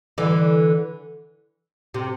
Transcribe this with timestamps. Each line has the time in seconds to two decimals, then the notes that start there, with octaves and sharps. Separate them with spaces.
0.18 D3 E3
1.94 C3